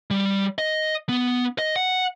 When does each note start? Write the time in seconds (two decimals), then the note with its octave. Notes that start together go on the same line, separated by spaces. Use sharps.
0.11 G3
0.58 D#5
1.09 B3
1.59 D#5
1.76 F#5